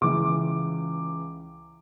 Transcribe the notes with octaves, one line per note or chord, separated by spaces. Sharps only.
C#2 C#3 E3 D6